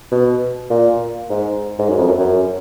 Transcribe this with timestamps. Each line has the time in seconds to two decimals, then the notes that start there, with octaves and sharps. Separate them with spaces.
0.12 B2
0.70 A#2
1.30 G#2
1.79 G#2
1.89 F#2
1.98 F2
2.08 F#2
2.18 F#2